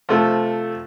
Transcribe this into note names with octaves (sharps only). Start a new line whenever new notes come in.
C3 F3 A3